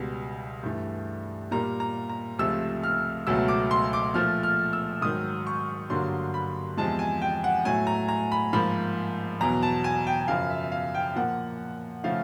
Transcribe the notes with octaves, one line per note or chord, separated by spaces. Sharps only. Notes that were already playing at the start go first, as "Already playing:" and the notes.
Already playing: C#2 B2 G3
G2 E3 A3
A#2 G3 A#3 A#5
A#5
A#5
C#2 C3 F3 A3 E6
F6
C#2 B2 F#3 A3 E6
D6
C6
D6
A#2 F3 A3 F6
F6
E6
G#2 D#3 F#3 D#6
C#6
G2 D3 F#3 A#3 C6
B5
E2 C3 F3 G#3 A5
G#5
G5
F#5
A2 F#3 A3 G#5
A#5
A#5
B5
G#2 F3 A#3 B5
E2 B2 F#3 A#5
A5
G#5
G5
F#2 C#3 F3 F5
E5
F5
G5
A#2 F3 A#3 F#5
C#3 F3 A3 F5